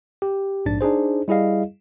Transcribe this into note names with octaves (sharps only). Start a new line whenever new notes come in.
G4
A#1 G#2 D4 A6
D4 D#4 G#4 C5
G3 E4 G#4 D#5 F5